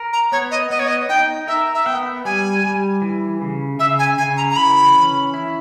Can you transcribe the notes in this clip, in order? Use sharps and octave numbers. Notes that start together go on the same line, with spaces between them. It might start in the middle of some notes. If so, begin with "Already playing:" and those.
Already playing: A#4
A#5
B3 C#5
D#5
B3 D#5
C#5
D#5
D#4 G5
A#4 E5
E5
B3 G5
G3 G#5
G3
E3
C#3
C#3 E5
G#5
C#3 G#5
A#5
A#5
E3 B5
C#4
E4